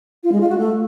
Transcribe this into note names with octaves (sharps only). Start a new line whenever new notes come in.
F4
G#3
F4
F#4
A3